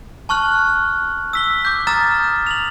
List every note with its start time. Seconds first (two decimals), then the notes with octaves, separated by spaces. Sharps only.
0.29 A5 C#6 F6 F#6 F#7
1.33 E6 B6 G7
1.65 D6 G6
1.87 A#5 D#6 F6 A6 E7
2.47 F7 F#7